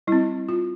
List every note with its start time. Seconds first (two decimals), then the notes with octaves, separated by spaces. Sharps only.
0.07 G3 C4 E4
0.49 F4